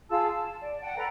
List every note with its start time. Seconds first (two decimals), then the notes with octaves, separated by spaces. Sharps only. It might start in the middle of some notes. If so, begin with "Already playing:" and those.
0.09 F4 G#4 A5 E6
0.30 A5
0.61 D5
0.80 F#5 G5 A5
0.96 A4 B4 G5 A#5